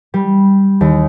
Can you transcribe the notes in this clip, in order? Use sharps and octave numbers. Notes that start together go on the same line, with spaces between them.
G3
D#2